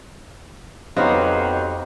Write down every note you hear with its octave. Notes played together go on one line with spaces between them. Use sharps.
F2 F#3 B3 D#4 F#4 G4 C5 F5